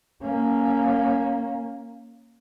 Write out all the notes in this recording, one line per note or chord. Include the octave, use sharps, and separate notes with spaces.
A#3 C#4